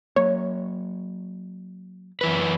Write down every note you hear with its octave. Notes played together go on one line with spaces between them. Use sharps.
F#3 A#3 C#5
F#2 E3 B4